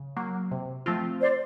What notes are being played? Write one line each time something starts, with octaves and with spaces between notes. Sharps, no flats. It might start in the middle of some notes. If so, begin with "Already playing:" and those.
Already playing: C#3
F#3 A#3
C3
F3 A3 C4 F4
C5 D5